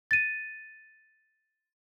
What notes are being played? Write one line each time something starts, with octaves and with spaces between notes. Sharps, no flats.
A6 D#7